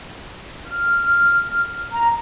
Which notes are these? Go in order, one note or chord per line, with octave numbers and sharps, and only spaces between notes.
F6
A#5